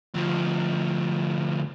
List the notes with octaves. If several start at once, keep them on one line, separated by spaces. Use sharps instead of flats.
D2 F3